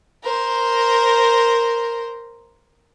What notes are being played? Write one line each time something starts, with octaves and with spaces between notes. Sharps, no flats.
A#4 C5